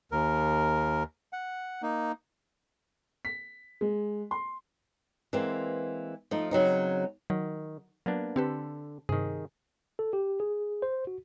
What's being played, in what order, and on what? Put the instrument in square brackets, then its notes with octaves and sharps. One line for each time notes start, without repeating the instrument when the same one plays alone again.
[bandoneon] D#2 A#4
F#5
A#3 D#4
[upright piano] B6
G#3
C6
[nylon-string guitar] E3 G#3 A#3 C4
F3 A3 D#4
C#3 F#3 C4 D#4
[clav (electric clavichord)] D#3 [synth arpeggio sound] F#3
[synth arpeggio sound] F#3 [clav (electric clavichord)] A#3 B3 D4
[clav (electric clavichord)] D3 A4 [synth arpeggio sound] C4 G4 B4
[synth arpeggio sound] G2 C3 [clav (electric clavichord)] D#3 G#4
[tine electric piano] A4
G4
G#4
C5
F#4